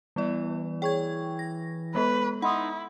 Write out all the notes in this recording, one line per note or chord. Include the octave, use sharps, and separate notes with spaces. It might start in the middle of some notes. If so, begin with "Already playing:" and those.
E3 G3 B3 D5
G#4 C#5 G5 C#6 G#6
A#6
G#3 B3 A4 B4
D#4 E4 F#5 B5 C6 D#6